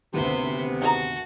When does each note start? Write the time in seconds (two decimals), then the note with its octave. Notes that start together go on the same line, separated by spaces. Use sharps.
0.14 G#1 D2 C3 B3 C5 E5
0.82 D#4 F#4 G#4 A5 A#5